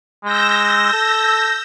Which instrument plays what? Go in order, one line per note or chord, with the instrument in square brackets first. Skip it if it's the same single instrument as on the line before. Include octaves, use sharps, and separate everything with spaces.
[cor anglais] G#3 [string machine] E6 G6 A#6
[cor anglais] A4